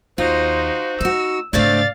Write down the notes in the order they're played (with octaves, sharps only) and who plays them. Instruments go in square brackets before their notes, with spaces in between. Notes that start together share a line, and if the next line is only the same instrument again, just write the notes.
[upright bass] D#2 [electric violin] D#4 F#4 [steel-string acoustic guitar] F4 [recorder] C5
[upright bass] A3 [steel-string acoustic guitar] D#4 F#4 [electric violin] E6
[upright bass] G#2 C#3 [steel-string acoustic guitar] A3 C4 D4 [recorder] D5 [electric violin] F5 A6